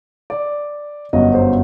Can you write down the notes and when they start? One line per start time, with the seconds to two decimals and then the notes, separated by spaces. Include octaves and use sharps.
0.30 D5
1.13 G1 F#2 F#3 D#5
1.34 C5